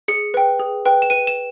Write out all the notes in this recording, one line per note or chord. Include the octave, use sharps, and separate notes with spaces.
G#4 C#7
B4 G5
G#4
B4 G5
E7
B4 D#7
E7